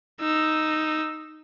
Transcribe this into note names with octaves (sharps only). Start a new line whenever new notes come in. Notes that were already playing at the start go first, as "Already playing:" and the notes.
D#4 E6